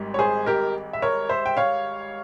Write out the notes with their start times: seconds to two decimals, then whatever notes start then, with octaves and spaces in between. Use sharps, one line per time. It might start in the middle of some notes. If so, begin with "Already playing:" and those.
Already playing: G#1 G#2 G3
0.14 C#5
0.19 G#4 C5
0.46 G4 A#4
0.93 E5
1.02 A#4 C#5
1.29 C5 E5
1.46 G5
1.57 C#5 F5